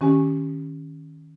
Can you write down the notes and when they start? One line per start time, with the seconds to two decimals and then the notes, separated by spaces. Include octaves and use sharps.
0.01 D#3 C#4 G4 G#5